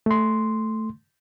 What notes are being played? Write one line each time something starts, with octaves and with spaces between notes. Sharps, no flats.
A3 C6